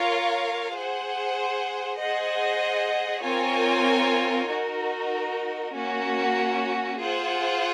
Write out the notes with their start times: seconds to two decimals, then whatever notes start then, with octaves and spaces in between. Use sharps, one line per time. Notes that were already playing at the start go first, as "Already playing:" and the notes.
Already playing: F4 A#4 C#5 F5
0.73 G#4 C5 F#5
1.98 G#4 C5 D#5 F#5
3.24 C4 F4 A#4 C#5 G#5
4.49 D#4 F#4 A#4
5.74 A#3 C#4 F#4
6.99 F4 G#4 C5 F#5